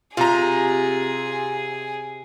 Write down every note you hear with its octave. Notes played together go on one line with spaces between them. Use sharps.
C3 F4 G#4 A#5